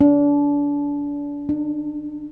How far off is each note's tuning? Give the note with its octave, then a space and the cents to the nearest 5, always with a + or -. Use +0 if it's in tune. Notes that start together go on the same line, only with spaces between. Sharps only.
D4 -30
D4 +35